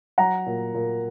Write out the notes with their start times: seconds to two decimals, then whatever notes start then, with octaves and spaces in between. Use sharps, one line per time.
0.18 F#3 F#5 A#5
0.46 A#2
0.74 A#2